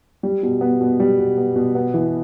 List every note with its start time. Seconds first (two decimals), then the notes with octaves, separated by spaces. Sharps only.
0.23 G3
0.43 B2
0.61 B3
0.81 B2
1.00 G3
1.18 B2
1.38 B3
1.56 B2
1.75 B3
1.94 E3